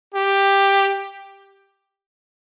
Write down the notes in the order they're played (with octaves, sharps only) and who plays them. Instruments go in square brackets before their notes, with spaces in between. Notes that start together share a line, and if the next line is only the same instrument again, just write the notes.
[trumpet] G4